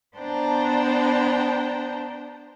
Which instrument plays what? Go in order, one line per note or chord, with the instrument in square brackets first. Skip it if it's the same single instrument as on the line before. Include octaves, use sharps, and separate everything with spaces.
[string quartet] B3 D4 C5 G5 A5 A#5